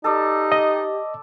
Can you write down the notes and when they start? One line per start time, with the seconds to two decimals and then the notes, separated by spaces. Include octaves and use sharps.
0.04 D#4 G4 A4 D5
0.52 D#5